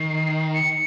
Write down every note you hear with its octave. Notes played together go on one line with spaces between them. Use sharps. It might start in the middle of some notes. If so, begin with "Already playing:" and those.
Already playing: D#3 C7
C#7